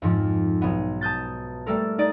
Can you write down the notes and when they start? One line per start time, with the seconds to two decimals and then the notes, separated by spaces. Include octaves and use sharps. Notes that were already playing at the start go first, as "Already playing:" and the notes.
0.02 F2 G#2 F3
0.62 B1 B3
1.01 A5 D#6 G6 A6
1.66 G3 A3 A4 A#4
1.98 D#4 D5 D#6